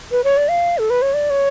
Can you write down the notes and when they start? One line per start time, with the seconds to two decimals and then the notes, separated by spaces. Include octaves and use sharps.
0.12 B4
0.24 C#5
0.37 D5
0.50 F5
0.78 A4
0.90 B4
1.02 C#5
1.14 D5
1.30 C#5